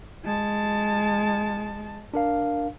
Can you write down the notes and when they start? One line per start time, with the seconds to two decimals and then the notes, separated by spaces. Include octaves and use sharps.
0.24 G#3 A5
2.14 D4 A#4 F5